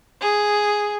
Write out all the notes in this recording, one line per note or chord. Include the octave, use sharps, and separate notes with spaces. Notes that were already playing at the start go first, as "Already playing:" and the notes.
G#4